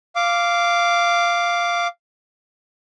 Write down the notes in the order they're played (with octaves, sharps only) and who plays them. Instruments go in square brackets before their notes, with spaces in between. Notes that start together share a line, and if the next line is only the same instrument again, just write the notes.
[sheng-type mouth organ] F5 D6